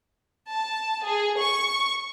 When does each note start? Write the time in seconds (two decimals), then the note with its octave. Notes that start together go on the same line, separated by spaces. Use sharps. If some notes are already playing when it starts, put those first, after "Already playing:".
0.52 A5
1.05 G#4
1.40 C#6